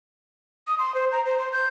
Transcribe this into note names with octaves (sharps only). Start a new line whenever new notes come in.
D#6
C6
C5
A#5
C5
C6
G6